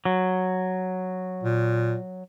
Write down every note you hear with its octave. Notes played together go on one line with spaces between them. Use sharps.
F#3
A#2